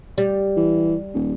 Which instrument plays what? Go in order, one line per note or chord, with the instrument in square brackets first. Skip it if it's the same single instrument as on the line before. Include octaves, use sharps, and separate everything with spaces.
[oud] G3
[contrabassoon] E3
D#1